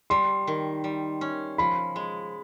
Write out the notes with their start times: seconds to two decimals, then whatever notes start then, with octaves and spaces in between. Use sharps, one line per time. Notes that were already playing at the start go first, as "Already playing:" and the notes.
0.10 G3 C6
0.47 D#3
0.84 G3
1.21 C#4
1.58 F3 B5
1.96 G#3